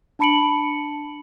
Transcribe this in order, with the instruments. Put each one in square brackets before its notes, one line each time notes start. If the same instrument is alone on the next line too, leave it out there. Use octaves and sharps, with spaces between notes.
[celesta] D4 A5 B5 C#7 D7 F#7